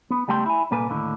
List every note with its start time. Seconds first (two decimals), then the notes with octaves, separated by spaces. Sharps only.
0.10 B3
0.28 C#2 G3 A3 G5 C6
0.46 E4 G#5
0.71 C2 A#2 A#3 A4 B4 G#5
0.90 D#2 A2 D3